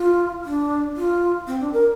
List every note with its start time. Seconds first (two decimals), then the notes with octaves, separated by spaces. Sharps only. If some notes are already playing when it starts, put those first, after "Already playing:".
Already playing: F4
0.45 D4
0.96 F4
1.47 C4
1.60 D4
1.73 A#4